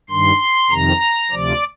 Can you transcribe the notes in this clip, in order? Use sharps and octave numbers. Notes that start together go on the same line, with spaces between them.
G2 D#3 C6
F2 C3 D#3 A#5
D2 C3 F3 D5